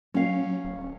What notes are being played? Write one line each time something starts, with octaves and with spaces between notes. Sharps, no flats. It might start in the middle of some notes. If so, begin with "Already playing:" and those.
F#3 C#4 F5
D1